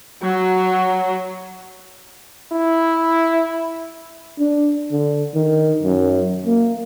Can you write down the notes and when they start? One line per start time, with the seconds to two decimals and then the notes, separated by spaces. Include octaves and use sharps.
0.23 F#3 F#4
2.52 E4
4.39 D4
4.92 D3
5.35 D#3
5.83 F#2
6.46 A#3